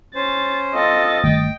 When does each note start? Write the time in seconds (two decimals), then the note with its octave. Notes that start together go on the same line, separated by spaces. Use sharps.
0.15 C#4 C5 A6
0.74 C4 F4 A4 D#5 A6
1.24 G1 D#3 A3 G5